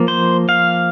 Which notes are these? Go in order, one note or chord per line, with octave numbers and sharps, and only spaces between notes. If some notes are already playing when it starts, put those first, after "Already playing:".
Already playing: F3 A#3
C5
F5